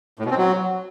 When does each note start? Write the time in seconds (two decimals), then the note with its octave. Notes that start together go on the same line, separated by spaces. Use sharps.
0.19 A2
0.25 B2
0.31 C4
0.37 F#3